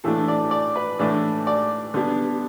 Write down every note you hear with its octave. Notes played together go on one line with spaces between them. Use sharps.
A2 E3 A3 D4 A4
D5
D5
B4
A2 E3 A3 D4 D5
D5
D3 G3 B3 D4